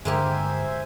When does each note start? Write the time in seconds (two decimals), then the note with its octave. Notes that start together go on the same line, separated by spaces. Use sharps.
0.05 G2 D3 G#3 A#3 G4 C5 E5 G#5